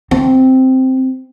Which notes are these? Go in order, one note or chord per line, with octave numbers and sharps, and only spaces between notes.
C4